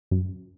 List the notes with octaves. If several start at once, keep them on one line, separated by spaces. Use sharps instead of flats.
F#2